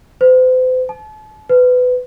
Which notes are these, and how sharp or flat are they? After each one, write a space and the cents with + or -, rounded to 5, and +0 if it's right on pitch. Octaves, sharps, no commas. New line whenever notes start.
C5 -40
A5 -35
B4 +20